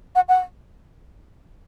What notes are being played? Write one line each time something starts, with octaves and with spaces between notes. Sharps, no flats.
F#5
F#5